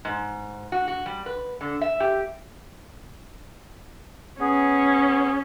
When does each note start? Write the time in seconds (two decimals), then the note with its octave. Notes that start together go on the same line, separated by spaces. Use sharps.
0.05 G#2
0.72 F#4
0.88 F#4
1.06 G3
1.26 B4
1.61 D3
1.81 E5
2.00 G4
4.40 B3 C#4 G#4